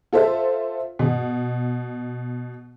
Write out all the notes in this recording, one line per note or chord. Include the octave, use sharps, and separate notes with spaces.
F4 A4 C5 E5
B2